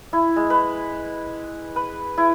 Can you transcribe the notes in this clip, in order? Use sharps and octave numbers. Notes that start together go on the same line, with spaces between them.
E4
G#3
B4
B4
E4